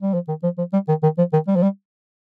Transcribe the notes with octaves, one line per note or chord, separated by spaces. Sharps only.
G3
F3
D#3
F3
F3
G3
D#3
D#3
F3
D#3
G3
F3
G3